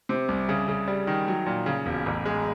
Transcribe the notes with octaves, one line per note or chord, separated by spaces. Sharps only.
C3
C2
C#3
C#3
G3
D#3
F#3
A#2
C#3
E1
A1
G#3